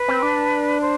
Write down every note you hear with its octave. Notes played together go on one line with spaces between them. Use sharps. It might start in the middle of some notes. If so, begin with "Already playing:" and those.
Already playing: B4
C4
D4
C5